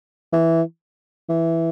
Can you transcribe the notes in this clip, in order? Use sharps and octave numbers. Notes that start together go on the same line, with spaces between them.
E3
E3